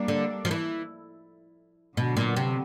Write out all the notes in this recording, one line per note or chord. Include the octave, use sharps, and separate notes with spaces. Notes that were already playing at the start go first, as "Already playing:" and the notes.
Already playing: G3 A#3 D4
D3
F3
E3
B2 D3 F#3 B3
A#2
C3